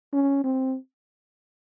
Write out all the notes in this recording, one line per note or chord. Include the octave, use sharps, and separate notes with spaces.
C#4
C4